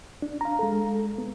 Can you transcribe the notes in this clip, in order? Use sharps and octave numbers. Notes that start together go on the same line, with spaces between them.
D4
F5 A#5
G#3 A4
B3